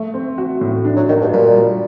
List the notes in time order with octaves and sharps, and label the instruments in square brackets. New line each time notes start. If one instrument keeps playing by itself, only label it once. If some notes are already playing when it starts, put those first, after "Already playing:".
Already playing: [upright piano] A3
C4
F#4
A2
D4
[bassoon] F#3
[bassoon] D#3 [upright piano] F#4
[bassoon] G2
[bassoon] A#2 [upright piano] G3
[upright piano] G3